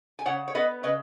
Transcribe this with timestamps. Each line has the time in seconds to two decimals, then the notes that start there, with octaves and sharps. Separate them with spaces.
0.19 G#5
0.26 C#3 C#5 F#5
0.48 C#5
0.55 B3 B4 D#5
0.83 C#3 B4 D#5